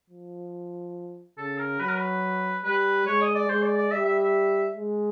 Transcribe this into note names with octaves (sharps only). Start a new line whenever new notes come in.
F3
C#3 A4
A#4
F#3 B4
A#4
B4
G3 B4
G#3 C#5
D#5
D5
G#3 C5
D5
D5
G3 E5
E5
E5
G#3